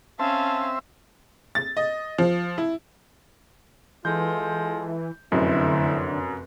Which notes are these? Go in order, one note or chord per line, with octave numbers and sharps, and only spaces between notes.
C4 C#4 E5 F5 A5
A6
D#5
F3
E4
E3 G#3 F4 A4 G6
F1 F#2 D3 A3 C4 E4